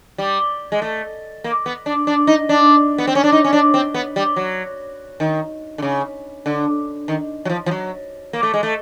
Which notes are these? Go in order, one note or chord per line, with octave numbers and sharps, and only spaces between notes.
G3
G#3
A3
A#3
B3
D4
D4
D#4
D4
B3
C4
C#4
D4
D#4
C#4
D4
C4
B3
G3
F#3
D#3
D3
C#3
D3
D#3
F#3
F3
F3
F#3
A#3
A3
G#3
A3